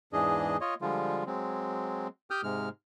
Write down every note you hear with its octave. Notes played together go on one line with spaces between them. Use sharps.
E2 G#2 E3 D4 G#4 D#5
F4 C#5 D#5
D3 F3 G3 G#3 F4
F#3 G#3 C4
G4 G5 D#6 F6 G6
G#2 C3 G#3 F6